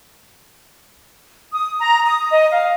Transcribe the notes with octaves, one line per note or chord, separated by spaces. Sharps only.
D#6
A#5
D#6
D#5
F5